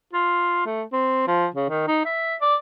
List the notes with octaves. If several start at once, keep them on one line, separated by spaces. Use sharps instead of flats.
F4
A3
C4
F3
C#3
D#3
D#4
E5
D5